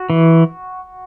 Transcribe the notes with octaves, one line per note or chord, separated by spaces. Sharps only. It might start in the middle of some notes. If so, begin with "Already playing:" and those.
Already playing: F#4
E3